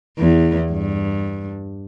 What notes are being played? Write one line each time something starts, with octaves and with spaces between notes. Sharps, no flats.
E2
G2